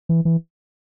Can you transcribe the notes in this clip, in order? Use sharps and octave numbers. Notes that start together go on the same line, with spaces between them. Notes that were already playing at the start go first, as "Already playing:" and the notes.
E3
E3